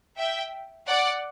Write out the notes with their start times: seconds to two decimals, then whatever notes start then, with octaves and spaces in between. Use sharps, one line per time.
0.18 E5 G5
0.87 D5 F#5